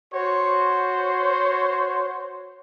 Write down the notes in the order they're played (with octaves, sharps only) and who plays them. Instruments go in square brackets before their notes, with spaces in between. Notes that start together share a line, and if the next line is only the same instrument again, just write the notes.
[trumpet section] F#4 C5 C#5